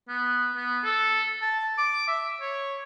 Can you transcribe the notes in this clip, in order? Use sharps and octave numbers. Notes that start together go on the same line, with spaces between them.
B3
B3
A4
A5
D6
E5
C#5